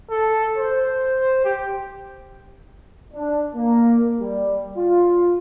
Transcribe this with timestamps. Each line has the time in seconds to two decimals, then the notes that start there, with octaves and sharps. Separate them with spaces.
0.10 A4
0.58 C5
1.45 G4
3.14 D4
3.55 A#3
4.20 G3
4.77 F4